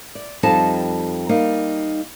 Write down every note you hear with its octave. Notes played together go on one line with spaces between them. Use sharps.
D5
F2 G3 D#4 A4 D#5 A5
G3 A#3 D#4